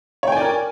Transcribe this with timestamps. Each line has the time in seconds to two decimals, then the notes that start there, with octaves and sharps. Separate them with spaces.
0.23 C#5
0.28 G5
0.32 G#5
0.37 D5
0.41 A#4